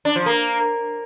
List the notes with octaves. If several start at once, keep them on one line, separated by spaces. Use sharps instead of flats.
D4
F3
A#3